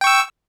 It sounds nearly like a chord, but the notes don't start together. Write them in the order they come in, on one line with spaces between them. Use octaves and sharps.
G5 C#6 E6